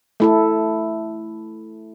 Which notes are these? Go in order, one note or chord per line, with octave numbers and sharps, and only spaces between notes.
A3 E4 A4